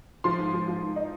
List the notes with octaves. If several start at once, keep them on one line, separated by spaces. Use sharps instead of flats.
F3 C6
G#2
F3
F3
G#2
D#4